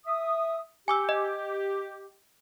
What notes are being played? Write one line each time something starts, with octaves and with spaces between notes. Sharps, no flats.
E5 D#6
G4 G#5 D6 E6
D#5